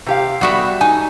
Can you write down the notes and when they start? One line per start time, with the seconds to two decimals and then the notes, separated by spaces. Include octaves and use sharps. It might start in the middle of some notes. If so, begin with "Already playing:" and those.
0.06 C3 G4 F5
0.41 G3 B3 F#4 E5
0.81 D#4 G#5